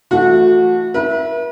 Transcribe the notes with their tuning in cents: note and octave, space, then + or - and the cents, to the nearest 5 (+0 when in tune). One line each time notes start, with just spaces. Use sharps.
E3 +0 A3 +0 F#4 -25
E4 +0 B4 -45